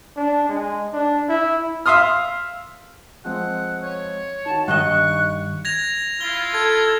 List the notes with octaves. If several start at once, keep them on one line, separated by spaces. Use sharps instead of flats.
D4
G#3
D4
E4
E5 F5 C6 D#6 F6
F3 G#3 C4 F#5
C#5
D#3 F#4 A5
G2 D#3 D#4 D#5 F#5 C#6 F#6
G#6 A#6 F7
E4 F4 G7
A4 G#6